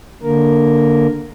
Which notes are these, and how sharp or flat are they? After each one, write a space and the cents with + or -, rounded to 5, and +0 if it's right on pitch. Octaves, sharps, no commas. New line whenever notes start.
D3 +0 A#3 +0 A#4 +0